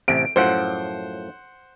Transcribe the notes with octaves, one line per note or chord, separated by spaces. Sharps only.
A1 C3 D7
F#2 A2 F3 C5 F#5